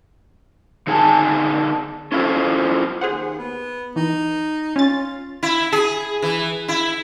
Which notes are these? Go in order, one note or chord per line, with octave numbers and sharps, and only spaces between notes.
D3 D#4 G#4 F5 G#5 A5
C#4 E4 F4 A4 C5
D#2 G#4 C5 F#5
B3
E3 D#4
C#4 F4 A6
E4
G#4
E3
E4